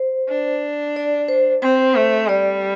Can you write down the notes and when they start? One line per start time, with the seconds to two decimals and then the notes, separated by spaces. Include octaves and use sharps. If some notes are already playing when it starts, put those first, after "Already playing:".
Already playing: C5
0.29 D4
0.96 D5
1.28 C5
1.62 C4 C5
1.95 A3
2.28 G3 D5